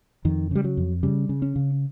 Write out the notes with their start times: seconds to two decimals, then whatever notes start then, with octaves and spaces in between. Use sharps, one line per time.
0.25 F2 D#3
0.51 C#3 G3
0.64 F#3
0.77 F2
1.03 C#3 G3
1.29 C#3
1.42 C#4
1.56 C#3